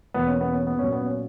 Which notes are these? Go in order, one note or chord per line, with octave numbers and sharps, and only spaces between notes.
E2 B2 A#3 B3
C#4
B3
C#4
B3
A#2 F#3 A#3 C#4
B3
C#4